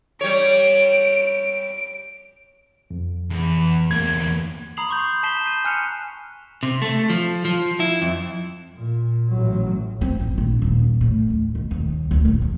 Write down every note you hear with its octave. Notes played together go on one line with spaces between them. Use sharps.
G3 C#5 D7
F2
E2
E2 A#3 G#6
A#5 B5 D#6 C7 F7 F#7
C6 C#6 G6
A5 B6 C7 E7 G7
G6 D#7
G#5 F6 F#6 C#7 F7
C3
A3
F3
F3
E4
F2
A#2
A1 F#3
C4
A1
A#1
D#1
A2
D#2
B2
D#2
D2
A#2
E2